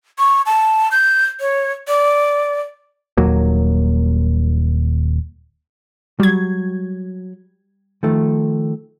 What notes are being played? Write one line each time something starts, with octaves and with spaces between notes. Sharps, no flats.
C#6
A5
G6
C#5
D5
D#1 D#2 F#3 A#3
F#3 G3 G#6
D#3 F3 A3